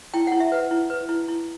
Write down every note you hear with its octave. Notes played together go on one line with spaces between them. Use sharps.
E4 G5
E4 F#5
E5
B4 F#5
E4
B4
E4
E4